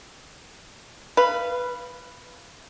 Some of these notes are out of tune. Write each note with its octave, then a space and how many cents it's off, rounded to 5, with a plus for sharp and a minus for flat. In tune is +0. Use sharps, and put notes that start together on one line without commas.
B4 +0 F5 -20